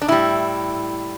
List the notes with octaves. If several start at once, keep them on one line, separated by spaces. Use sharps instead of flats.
D4
A2 G3 E4